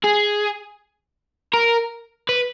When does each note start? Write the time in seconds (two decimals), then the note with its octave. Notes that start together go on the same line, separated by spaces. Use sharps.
0.04 G#4
1.54 A#4
2.29 B4